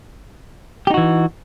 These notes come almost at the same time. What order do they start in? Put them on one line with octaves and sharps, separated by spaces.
G4 D#4 F#4 E3